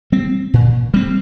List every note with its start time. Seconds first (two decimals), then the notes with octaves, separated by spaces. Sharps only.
0.12 G3 C4
0.54 A#2
0.94 G3 C4